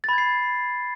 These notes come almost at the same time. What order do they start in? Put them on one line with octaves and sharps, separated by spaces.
A6 B5 G#6 C7